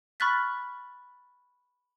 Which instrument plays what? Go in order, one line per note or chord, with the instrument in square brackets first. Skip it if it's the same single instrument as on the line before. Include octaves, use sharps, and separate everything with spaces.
[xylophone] B5 C#6 F6 F#6 A6 B6